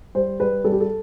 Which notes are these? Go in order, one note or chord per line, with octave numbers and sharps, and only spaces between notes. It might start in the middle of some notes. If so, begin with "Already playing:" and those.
G3 C5
G3 B4
G3 A4
G4
A4